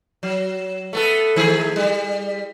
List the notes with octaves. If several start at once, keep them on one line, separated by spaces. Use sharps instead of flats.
F#3
A3 B3 A4
D#3 A3 G#4
G3